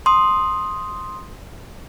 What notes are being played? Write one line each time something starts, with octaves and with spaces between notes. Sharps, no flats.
C6 D#6